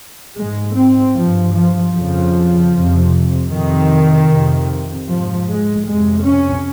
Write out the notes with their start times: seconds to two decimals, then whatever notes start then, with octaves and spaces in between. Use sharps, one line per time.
0.36 G#2 G#3
0.76 C4
1.15 G2 F3
1.54 F3
1.93 F2 C#3 F3
2.73 F2 C3
3.51 F2 C3 D#3
4.29 F2 C3
5.09 G#2 F3
5.48 G#3
5.87 F2 C3 G#3
6.26 C#4